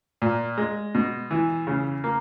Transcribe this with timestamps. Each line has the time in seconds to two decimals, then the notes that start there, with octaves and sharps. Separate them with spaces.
0.22 A#2
0.57 G#3
0.95 B2
1.31 E3
1.67 C#3
2.04 A#3